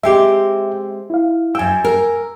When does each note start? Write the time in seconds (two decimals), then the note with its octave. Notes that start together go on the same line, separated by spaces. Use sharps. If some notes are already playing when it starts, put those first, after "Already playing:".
0.03 G#3 C4 G4 E5 G5
1.10 E4 F5
1.55 F#2 G5 G#5 E6
1.85 A#4